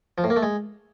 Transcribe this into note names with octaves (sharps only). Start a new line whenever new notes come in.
F3
A2
A#3
A3
G#3